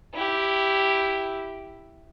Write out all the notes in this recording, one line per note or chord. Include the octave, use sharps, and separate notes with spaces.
E4 G4